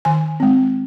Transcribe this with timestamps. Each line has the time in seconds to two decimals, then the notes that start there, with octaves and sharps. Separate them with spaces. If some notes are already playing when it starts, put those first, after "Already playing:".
0.05 D#3 G#5
0.40 G#3 C4